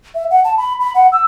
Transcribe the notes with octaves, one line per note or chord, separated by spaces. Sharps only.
E5
F#5
A5
B5
B5
F#5
E6